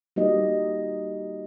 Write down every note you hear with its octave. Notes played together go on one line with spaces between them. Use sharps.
G3 A#3 D#4 F#4 G4 D#5